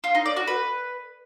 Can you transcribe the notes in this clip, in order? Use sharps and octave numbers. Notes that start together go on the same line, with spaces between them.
F4
D#4
D5
F#4
B4